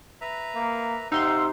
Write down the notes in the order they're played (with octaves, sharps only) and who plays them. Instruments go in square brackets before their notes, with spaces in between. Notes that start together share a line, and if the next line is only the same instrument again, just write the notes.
[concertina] B4 E5 A#5
[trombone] A#3
[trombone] C3 [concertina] C4 F5 F#5 [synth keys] D#4 C6 [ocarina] E6